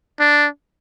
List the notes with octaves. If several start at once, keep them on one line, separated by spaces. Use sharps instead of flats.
D4